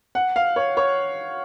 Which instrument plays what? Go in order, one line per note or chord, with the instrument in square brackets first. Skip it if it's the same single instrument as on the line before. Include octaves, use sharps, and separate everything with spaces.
[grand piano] F#5
F5
C#5
C#5